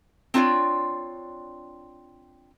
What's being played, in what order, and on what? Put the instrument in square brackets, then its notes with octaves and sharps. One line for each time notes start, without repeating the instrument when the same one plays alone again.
[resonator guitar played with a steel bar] C4 D4 F4 C#5 D5